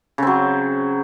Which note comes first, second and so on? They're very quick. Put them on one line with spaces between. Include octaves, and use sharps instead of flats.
C#3 C4 F#3